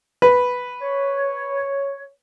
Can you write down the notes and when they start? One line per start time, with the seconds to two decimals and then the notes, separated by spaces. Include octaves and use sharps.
0.22 B4
0.81 C#5